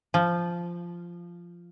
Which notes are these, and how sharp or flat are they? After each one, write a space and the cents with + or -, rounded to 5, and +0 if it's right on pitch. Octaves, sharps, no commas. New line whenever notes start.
F3 -10